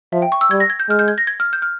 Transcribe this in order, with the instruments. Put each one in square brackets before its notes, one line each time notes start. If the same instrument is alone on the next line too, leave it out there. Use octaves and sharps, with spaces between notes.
[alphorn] F3 [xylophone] E5
[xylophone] G5
C#6
E6
[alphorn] G3 [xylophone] G#6
[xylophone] A#6
G#6
G6
[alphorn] G#3 [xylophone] F6
[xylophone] G6
G#6
A#6
G#6
F6
G6
F6